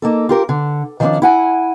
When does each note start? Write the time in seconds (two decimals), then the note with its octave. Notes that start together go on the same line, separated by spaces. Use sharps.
0.02 A#3 D#4 A4
0.29 F4 G4 A#4
0.49 D3
1.00 D#3 F3 G3 A3 C#4 D4
1.22 E4 F#5 G#5